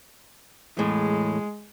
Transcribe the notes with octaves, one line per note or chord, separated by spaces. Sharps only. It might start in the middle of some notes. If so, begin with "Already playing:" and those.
E2 A2 G#3